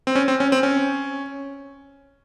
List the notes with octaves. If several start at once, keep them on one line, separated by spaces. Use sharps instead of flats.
C4
C#4
C4
C#4
C4
C#4